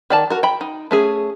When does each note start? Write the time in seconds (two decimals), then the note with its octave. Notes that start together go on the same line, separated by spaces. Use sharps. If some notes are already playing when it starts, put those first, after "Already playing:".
0.10 D#3 D5 A5
0.30 F#4 A#4
0.43 G5 B5
0.61 D#4
0.91 A3 C#4 G#4